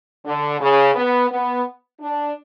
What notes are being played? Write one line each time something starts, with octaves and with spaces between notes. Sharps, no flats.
D3
C#3
B3
B3
D4